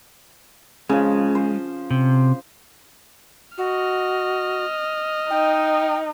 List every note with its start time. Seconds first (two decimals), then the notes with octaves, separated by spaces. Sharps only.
0.89 C#3 F3 G#3
1.35 C5
1.90 C3
3.58 F#4 D#5 F6
5.30 D#4 G5